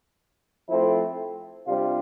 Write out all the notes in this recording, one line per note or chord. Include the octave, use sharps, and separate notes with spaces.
F3 A3 C4 E4
C3 G3 D4 F4